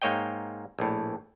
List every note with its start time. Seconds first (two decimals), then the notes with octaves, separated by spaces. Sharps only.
0.02 G#2 A#3 C#5 D#5 G5
0.79 A#1 A2